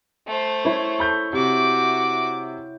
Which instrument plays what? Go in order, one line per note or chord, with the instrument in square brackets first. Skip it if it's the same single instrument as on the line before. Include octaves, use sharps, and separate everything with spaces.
[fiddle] A3 C5
[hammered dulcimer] E4 C#5
[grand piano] A4 B5 G6
[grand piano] C3 [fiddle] F#4 D6